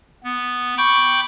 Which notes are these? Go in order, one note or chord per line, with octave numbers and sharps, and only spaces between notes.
B3
G5 B5 C#6 D6 G6